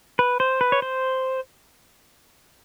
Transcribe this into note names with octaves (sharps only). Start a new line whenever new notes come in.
B4
C5
B4
C#5
C5